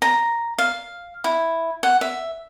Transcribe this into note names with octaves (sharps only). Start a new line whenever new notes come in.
A#5
F5
E4
F#5
E5